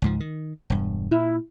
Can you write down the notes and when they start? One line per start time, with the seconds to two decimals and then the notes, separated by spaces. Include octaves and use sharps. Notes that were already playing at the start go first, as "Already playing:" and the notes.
0.02 C#2 G#2 F3
0.20 D#3
0.70 E1 G2
1.11 A#2 E4